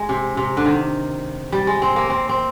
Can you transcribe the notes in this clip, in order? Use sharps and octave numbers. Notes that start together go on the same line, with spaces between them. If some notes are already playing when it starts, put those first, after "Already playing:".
Already playing: G#3
C3
C3
D3
D#3
G3
G#3
C4
A#3
C4
C4